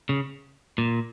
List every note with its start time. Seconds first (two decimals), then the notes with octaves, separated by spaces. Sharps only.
0.09 C#3
0.78 A#2